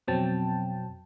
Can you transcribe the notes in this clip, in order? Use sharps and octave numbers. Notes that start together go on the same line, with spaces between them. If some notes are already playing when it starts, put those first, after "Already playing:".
F2 B2 F#3 C4 G5 A5